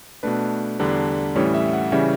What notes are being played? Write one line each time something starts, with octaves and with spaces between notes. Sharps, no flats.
B2 A3 D4 B4
E2 D3 G3 D4
A2 E3 G3 C#4 C#5
E5
F#5
C#3 E3 G3 C#4 E5